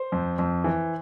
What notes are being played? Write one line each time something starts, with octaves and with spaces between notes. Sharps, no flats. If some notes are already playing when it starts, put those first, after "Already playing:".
Already playing: C5
F2
F2
E3